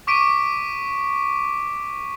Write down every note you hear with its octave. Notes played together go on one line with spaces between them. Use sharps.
C#6 D6 B6 D7 D#7